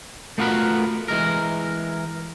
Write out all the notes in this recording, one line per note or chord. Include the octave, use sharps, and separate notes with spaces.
A3 B3 F4 F#4 A#4 B4
E3 G#3 A#4